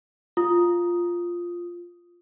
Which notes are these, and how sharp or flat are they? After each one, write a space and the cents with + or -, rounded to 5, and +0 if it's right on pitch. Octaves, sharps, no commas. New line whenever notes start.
F4 +0 D#6 +0